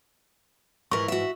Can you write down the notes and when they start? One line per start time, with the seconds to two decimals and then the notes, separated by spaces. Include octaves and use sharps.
0.91 G#2 E3 E4 A#4 C#6
1.08 F#4 E5